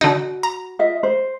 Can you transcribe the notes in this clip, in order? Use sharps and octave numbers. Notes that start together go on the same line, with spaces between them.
D3 D#4 F#4
A#5
F4 D#5 E5
C5